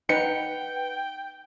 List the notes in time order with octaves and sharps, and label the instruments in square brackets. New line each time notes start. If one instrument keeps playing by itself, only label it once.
[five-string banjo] D#4 [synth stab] B4 F#5 [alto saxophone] G5 [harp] C#7